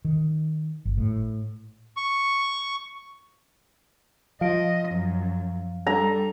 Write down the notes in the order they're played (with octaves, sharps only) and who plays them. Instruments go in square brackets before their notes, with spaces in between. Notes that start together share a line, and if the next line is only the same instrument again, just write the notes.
[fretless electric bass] D#3
G1
A2
[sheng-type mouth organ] C#6
[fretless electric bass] F3 [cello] D#5 [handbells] F5 D7
[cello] F#2
[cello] G3 [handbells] D4 A4 [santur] A#5